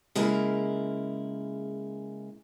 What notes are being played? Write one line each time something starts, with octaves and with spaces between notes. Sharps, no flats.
C#3 G#3 A#3 E4 A#4